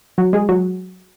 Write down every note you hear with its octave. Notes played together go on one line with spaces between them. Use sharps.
F#3 F#4
G#3 G#4
F#3 F#4